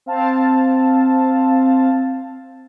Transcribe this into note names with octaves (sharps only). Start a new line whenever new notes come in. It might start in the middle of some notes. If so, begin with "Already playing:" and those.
C4 F5 A5